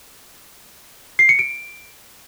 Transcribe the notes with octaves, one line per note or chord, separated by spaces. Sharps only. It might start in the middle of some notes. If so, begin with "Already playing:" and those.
C7
C#7
D7